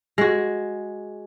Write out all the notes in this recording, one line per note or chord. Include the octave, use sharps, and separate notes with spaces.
G#3 F#4